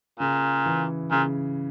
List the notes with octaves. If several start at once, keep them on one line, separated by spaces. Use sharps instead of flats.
A#2 C#3
E3
A#2 C#3